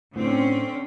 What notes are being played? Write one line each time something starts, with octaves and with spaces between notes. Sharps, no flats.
A2 D3 C4 C#4